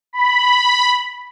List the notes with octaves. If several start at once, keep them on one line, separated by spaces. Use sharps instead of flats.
B5